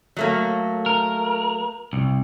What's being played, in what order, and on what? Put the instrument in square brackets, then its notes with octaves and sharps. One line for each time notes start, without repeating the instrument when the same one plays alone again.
[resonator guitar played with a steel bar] F#3 A3 A#3
[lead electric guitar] A#4
C2